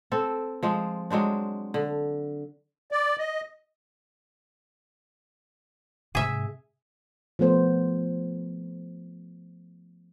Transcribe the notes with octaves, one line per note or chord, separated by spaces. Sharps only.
C4 A4
F3 G#3 C4
F#3 G#3 C4 D4
D3
D5
D#5
G#2 C3 G#4 E5
F3 A3 B3 C5